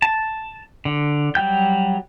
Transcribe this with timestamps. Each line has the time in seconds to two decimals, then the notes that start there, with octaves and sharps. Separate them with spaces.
0.02 A5
0.85 D3
1.35 F#3 G3 G5 G6